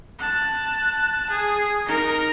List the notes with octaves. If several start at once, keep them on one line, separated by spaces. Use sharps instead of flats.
A5 F#6
G#4
D#4 A#4